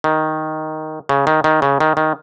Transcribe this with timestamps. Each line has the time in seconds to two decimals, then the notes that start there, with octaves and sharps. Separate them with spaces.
0.04 D#3
1.09 C#3
1.27 D#3
1.44 D#3
1.62 C#3
1.80 D#3
1.97 D#3